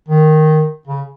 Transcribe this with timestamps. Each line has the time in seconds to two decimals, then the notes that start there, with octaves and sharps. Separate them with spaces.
0.08 D#3
0.87 C#3